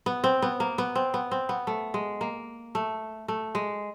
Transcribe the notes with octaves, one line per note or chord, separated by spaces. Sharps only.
B3
C4
B3
A#3
B3
C4
B3
C4
B3
A3
G#3
A#3
A3
A3
G#3